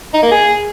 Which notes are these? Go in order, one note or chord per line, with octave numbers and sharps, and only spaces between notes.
D#4
A#3
G#4